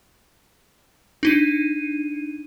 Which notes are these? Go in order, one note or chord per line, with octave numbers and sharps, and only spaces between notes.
D4 D#4 D#7